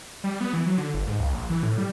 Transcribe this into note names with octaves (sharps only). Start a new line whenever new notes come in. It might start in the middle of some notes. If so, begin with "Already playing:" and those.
G3
B3
E3
F#3
D3
G1
G#2
C#2
A#1
E3
A2
G3